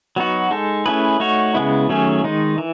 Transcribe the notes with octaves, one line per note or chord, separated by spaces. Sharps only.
F#3 B3 D#4 F#4
G#3 D#4 A4
A3 C#4 E4 G#4 B4
A3 D#4 F#4 C#5
C#3 G#3 B3 E4
D#3 F#3 A3 C#4 G#4
D#3 G#3 D#4
E3